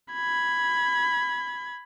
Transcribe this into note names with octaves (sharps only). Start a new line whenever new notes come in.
B5 G#6